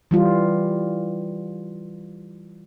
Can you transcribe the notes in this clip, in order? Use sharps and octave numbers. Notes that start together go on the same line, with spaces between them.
E3 G3 F4